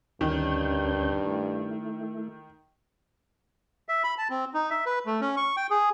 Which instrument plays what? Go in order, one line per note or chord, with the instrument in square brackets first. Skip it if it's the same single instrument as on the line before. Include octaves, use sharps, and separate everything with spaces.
[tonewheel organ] D2 C#4 G6 [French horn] G2 [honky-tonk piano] D#3
[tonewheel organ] A3 E4
[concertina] E5
B5
A5
C4
D#4
E5
B4
A3
C#4
C#6
G5
G#4